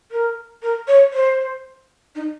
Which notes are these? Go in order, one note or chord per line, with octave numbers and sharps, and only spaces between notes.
A#4
A#4
C#5
C5
D#4